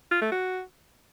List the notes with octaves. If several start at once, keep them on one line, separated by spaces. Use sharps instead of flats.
F4
A3
F#4